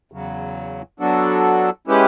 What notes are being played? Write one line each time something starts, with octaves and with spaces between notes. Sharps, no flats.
E2 C#3 F#3
F#3 B3 D4 F#4 A4
G#3 C#4 E4 G4 B4